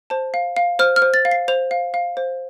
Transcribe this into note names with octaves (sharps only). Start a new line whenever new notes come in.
C5 A5
F5
F5
C5 F6
F6
C5
A6
F5
C7
C5 F7
F5
F5
C5